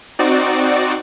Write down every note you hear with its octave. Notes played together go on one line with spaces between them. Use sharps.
C4 D#4 F#4 D5